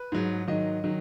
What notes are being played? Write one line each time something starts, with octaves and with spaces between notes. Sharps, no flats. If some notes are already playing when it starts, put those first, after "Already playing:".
Already playing: B4
G#2 F#3
G#2 D#3 F#3 D#5
D#3 F#3